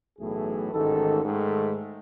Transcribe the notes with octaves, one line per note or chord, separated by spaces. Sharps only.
B1 A2 E3 A3 G#4
A1 G#2 D#3 A4
G#2 D#3 A3 A4